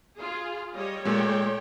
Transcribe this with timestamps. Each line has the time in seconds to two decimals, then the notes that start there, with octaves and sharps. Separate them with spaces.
0.19 F4 G#4
0.73 G3 C#5 D#5
1.05 A#2 G#3 A3 C#5 G5